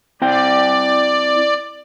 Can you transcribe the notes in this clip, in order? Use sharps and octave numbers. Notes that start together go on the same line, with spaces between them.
C4 E4 D5 G5